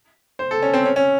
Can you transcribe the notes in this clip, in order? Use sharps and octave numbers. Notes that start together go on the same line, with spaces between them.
C5
A4
C#4
C4
C#4
C#4